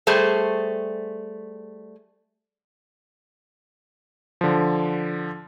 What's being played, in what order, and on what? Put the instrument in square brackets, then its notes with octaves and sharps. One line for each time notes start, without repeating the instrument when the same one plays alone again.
[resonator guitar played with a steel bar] G3 A3 G#4 C5
[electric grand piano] D3 F3